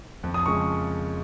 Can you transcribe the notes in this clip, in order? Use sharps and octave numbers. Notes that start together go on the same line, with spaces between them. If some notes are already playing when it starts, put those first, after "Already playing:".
F2
D#6
C#3 F3 G#3 C#6